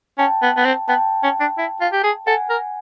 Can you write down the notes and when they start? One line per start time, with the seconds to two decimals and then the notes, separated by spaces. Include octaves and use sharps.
0.18 C#4 G5 A5
0.42 B3
0.57 B3
0.65 C4
0.88 B3 G5 A5
1.23 C#4
1.40 D4
1.58 E4
1.81 F4
1.93 G4
2.04 G#4
2.27 A4 F#5 G#5
2.50 A#4